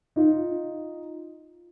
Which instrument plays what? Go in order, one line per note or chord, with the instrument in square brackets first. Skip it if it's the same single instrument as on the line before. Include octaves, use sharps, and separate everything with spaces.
[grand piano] D#4 F4